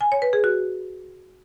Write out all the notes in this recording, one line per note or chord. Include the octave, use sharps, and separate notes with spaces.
G#5
C#5
B4
G#4
F#4